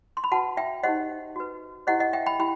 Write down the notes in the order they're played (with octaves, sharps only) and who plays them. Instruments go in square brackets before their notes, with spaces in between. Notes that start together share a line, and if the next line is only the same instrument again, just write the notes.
[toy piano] C6
B5
F#4 B4 F#5 A5
E5 G5
D#4 G4 C5 D#5 F#5
F#4 B4
E4 G4 C5 D#5 F#5
D#5 F#5
E5 G5
G5 B5
E4 G4 G5 B5